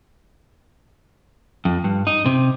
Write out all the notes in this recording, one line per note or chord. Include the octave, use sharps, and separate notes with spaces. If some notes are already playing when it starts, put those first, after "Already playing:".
F2
G2
D#4
C3